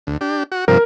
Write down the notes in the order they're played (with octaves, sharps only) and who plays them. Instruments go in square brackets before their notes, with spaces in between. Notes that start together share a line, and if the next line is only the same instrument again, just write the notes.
[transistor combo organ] D2
D4 G4
F#4
[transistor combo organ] G2 C3 F3 [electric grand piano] A#4